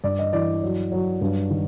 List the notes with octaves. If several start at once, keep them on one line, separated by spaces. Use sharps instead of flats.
G2 D5
D#5
E3 D5
F#3
F#3
G2
D#3